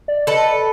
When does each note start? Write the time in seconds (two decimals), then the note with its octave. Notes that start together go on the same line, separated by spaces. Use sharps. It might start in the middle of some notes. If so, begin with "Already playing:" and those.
0.08 D5
0.27 A4 B4 D#5
0.47 D5